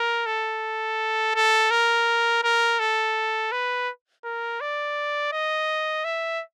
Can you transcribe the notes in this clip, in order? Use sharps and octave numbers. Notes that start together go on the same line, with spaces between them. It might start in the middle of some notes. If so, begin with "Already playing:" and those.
Already playing: A#4
A4
A4
A#4
A#4
A4
B4
A#4
D5
D#5
E5